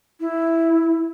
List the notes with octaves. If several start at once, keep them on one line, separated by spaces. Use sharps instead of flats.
E4